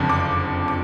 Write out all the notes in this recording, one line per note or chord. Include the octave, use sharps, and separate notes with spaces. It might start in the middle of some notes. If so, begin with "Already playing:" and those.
Already playing: F#1 F2 D3 F3
D6
D6